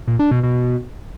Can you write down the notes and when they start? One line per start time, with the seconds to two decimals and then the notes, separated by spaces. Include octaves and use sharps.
0.07 A#2
0.19 D4
0.31 B2
0.43 B2